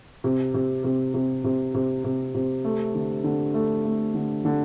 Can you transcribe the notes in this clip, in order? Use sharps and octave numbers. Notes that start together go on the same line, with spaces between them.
C3
C3
C3
C3
C3
C3
C3
C3
A3
D3
D3
A3
A3
D3
D3